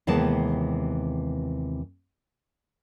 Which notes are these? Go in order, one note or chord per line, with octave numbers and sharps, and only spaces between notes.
D#2 C3 E3 G#3 B3 A5